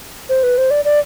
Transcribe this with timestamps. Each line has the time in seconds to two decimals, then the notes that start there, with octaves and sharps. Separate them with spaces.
0.29 C5
0.43 B4
0.58 C5
0.71 D5
0.85 D5